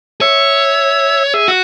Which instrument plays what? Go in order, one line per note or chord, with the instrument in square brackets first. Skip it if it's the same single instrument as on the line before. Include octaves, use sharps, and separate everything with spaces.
[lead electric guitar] C#5 [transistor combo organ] E5
[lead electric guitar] G#4 [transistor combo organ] E5
[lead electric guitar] F#4